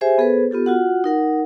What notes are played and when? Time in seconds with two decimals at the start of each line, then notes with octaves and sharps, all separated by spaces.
0.01 G4 G#4 C5 E5 G#5
0.18 B3 G#4 A4 B4 C5
0.51 B3 F4 G4 A4
0.66 F4 F#4 F#5
1.04 D#4 A#4 F#5